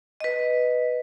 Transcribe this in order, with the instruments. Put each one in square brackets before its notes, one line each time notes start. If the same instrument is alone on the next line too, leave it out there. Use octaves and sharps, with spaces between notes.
[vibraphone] B4 D#5